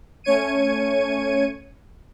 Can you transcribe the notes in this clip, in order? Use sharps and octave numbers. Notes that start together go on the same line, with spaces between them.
A3 C#4 C#5 G#6 C#7 D#7